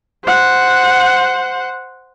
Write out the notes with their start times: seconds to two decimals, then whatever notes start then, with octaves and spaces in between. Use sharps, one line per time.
0.25 C5 F#5